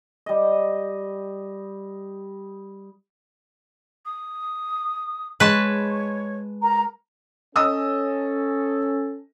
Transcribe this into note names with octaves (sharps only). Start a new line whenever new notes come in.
G3 D#5
D#6
G#3 B4 C#5 A5 B5 C#6
A#4 A#5
C#4 A4 D#5 D#6 E6